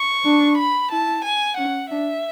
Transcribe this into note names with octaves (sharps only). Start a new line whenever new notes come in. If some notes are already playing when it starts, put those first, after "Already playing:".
Already playing: C#6
D4
B5
E4 A5
G#5
C#4 F#5
D4 E5